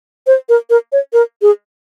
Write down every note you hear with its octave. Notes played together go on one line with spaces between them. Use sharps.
C5
A#4
A#4
C#5
A#4
G#4